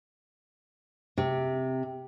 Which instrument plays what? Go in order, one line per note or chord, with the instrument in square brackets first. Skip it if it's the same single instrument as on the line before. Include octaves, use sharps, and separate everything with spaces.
[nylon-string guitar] C3